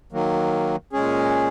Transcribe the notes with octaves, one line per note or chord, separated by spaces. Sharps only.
D#3 F#3 A#3
A#2 G#3 C#4 G#4